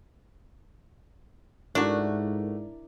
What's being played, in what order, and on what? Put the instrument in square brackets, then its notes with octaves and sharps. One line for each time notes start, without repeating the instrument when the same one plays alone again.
[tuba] G#2 [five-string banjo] A3 F#4 [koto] D4 [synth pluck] E4 A#4 D5